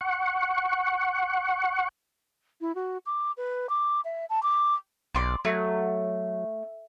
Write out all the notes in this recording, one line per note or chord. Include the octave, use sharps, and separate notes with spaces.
F#5 C#6
E4
F#4
D6
B4
D6
E5
A5
D6
B1 D5 C6
F#3 A3